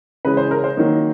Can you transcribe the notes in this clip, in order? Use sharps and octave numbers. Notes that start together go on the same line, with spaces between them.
C#3 E3 G#3 B4
C5
A#4
C5
D#3 F#3 A#3 D#4